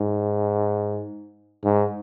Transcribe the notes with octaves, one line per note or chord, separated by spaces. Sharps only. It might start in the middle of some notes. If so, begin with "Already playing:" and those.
Already playing: G#2
G#2